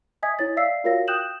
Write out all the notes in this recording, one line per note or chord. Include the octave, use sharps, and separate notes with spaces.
D#5 E5 G#5 D#6 G#6 B6
E4 C#5 A6
D5 E5 F5 E6 B6 C7
F4 F#4 A#4 C#5 F5 A#6
G5 D#6 F#6 G6 E7 F#7